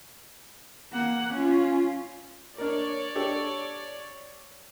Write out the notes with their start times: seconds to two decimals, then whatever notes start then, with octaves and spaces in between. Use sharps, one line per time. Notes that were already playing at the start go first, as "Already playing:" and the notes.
0.92 A#3 F#5
1.33 C#4 F4
2.58 D4 A#4 C#5 D5
3.15 D4 G4 A4